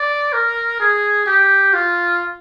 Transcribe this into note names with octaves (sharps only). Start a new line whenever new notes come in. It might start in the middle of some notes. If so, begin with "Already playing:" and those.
Already playing: D5
A#4
G#4
G4
F4